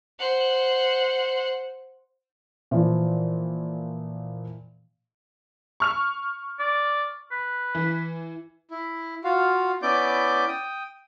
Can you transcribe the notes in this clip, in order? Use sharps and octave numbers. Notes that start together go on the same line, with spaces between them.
C5 F#5
A#2 E3 F3
C#6 F6 F7
D5
B4
E3
E4
F4 F#4 F5
B3 C#4 E4 D5 D6 G6
G5 D#6